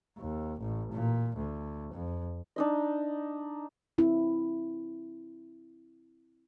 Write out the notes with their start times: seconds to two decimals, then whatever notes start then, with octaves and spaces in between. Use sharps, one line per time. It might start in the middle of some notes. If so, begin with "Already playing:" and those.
0.19 D#2
0.60 A1
0.92 A#2
1.37 D2
1.93 F2
2.56 D4 D#4 D#5
3.98 C4 E4